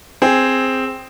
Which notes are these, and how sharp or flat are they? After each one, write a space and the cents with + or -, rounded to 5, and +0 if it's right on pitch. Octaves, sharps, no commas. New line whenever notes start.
C4 +0 G#4 +0